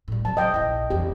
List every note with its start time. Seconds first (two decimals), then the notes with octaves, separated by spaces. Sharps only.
0.08 A2 G3
0.25 C3 F#3 A5
0.37 E3 C4 D#5 G5
0.54 A#1 E4
0.90 E1 E2 G4